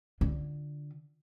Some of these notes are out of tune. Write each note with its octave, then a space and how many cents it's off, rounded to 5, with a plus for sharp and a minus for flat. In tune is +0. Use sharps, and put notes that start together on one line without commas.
D3 +0 F4 +0